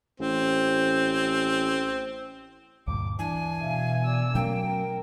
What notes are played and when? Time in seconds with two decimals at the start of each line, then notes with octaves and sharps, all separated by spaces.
0.20 A1 C4
2.88 D2 G2 A#2 D6
3.19 E3 D4 G#5
3.60 B2 E5 F5
4.05 D5 E6
4.35 F#3 A3 A#3 C#4 G5
4.66 A#4